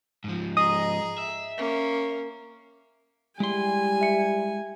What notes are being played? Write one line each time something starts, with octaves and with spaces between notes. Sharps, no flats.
G#2 F3
G#4 D#5 A#5
E5
A#3 C#4
G3 G#3 E4 G#5 C6
G4 E5 C#7